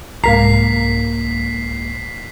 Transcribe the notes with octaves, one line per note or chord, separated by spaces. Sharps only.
C2 G#2 A#3 A#4 A#5 B6 C7